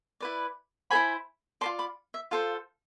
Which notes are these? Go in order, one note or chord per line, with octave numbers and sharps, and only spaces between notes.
E4 B4 D5
E4 A4 C5 G#5 B5
F4 B4 D5 A5 C6
B5 D6
E5
F4 A4 C5 F5